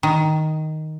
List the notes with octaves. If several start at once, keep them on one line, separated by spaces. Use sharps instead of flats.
D#3